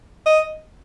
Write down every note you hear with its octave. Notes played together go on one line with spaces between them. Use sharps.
D#5